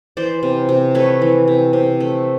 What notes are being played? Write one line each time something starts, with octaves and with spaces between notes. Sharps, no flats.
E3 C5 D5
C3
C3
A3 B4 C#5
E3
C3
C3
A3